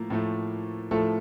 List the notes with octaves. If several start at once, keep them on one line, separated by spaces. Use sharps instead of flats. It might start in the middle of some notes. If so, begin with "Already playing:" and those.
Already playing: A2 F3 A3 A#3
A2 F3 A3
A2 F3 A3 A4